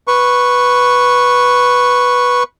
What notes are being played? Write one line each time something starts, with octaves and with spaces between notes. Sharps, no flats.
B4 C#6